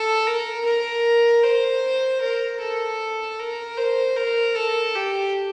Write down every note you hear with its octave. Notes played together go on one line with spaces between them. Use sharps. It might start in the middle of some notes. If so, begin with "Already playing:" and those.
Already playing: A4
A#4
A#4
C5
A#4
A4
A#4
C5
A#4
A4
G4